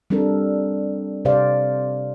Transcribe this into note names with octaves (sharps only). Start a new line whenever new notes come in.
G3 C4 D4 A4 A#4
C3 G4 C5 D5 F5